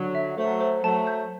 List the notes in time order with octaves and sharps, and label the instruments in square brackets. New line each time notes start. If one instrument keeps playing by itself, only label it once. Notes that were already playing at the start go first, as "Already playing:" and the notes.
Already playing: [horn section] D3 F#3
[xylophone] E5
[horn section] F#3 A3 [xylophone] C5
[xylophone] C5
[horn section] F#3 A3 [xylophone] A5
[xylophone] G6